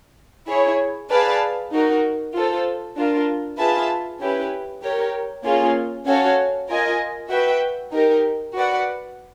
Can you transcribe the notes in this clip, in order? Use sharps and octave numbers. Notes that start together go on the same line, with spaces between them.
E4 G#4 C#5
G#4 B4 D5 F5 A5
D#4 F#4 A#4
F4 A4 C5
D4 F4 A#4
F4 G#4 B4 E5 A5
C#4 E4 G4 B4
G4 A#4 C#5
A#3 C#4 F4 G#4
C#4 F#4 A4 C#5 F5
F4 A#4 D#5 G#5
F#4 B4 E5 G5
D#4 G4 A#4
F#4 B4 D5 F#5